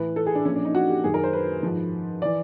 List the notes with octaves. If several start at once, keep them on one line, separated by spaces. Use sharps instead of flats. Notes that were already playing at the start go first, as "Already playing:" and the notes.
Already playing: A2 E3 B4
A4
G#4
D4
A#2 F3 C#4
D4
D#4
F#4
G4
F#2 D#3 G#4
A#4
C5
B4
G#2 F3
E3 D5